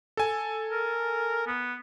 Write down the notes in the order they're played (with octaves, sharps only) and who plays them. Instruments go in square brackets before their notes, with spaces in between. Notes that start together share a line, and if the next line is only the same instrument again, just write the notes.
[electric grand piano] A4 G#5
[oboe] A#4
B3